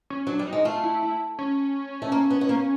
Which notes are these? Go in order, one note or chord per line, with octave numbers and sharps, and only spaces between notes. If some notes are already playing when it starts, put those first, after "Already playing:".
C#4
F#3 D4
G3
D#4
G#3
A3 F4
E4
E4
C#4
A3
A#3
B3
B3
A#3